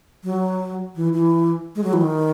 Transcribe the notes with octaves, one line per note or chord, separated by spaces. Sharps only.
F#3
E3
E3
G#3
F#3
E3
D#3